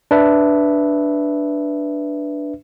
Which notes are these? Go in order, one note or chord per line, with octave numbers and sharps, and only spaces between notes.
D4 B4 E5